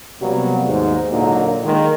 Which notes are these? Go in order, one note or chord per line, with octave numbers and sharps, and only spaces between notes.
C3 F#3 G3 A#3 B3
D#2 G#2
A#2 D3 F#3 A#3 D#4 A#4
D#3 G#3 A#3